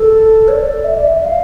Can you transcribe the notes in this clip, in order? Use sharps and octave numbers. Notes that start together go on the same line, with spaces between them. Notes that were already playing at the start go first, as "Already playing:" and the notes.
Already playing: A4
C#5
D5
E5
D5
E5
E5
F5